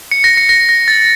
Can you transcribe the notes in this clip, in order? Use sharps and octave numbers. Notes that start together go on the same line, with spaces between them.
C#7
A#6
C#7
A#6
A#6
A6